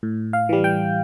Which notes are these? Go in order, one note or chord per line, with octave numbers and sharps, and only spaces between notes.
A2
F5
E3 G3
G5